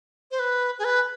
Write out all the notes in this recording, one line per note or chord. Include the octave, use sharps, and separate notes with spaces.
C5
B4
G#4
B4